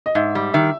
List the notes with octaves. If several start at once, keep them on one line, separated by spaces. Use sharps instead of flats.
D#5
G#2 E5
G3
D#3 E5